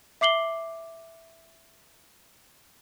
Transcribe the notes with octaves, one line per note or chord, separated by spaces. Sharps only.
E5 D6 C7 F#7 G7